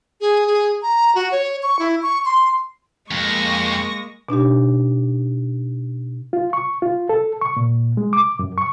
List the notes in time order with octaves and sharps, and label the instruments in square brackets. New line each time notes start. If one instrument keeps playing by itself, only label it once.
[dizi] G#4
G#4
A#5
F#4
C#5
C#6
E4
C#6
C6
[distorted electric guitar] F2 [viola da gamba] G#3 A#3 [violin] C#6 A#6
[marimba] B2 D4 D#4 G4
[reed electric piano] F4
C#6
F4
A4
C#6
A#2
G#3
D6
F#2
C#6